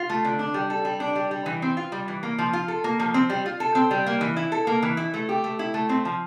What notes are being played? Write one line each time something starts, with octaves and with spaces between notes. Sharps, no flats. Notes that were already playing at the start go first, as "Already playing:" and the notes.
Already playing: F4
A3
D3
D4
G3
A4
G3
D4
G3
G3
E3
C4
F4
G3
E3
A#3
F3
F4
A4
A#3
F3
C4
G3
F4
A4
C4
G3
A#3
E3
E4
A4
A#3
E3
E4
A3
G4
A3
E4
A3
C4
F3